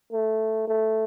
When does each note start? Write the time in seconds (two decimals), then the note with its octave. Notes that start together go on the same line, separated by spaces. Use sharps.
0.12 A3
0.67 A3